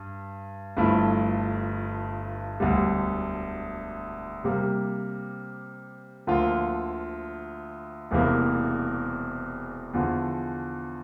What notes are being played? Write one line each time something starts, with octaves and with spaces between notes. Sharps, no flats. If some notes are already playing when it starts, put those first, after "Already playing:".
Already playing: G2
G1 G2 F3 A3 E4
E1 D2 D3 G3
C3 G3 A#3
D2 D3 F3 A#3 F4
E1 E2 C3 E3 A#3
E2 D3 F3